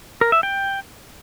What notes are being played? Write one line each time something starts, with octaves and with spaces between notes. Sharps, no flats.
A#4
E5
G5